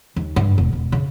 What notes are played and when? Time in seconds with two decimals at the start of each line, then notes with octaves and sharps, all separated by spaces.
0.16 D#2
0.36 G2
0.58 E1
0.73 E1
0.92 C#3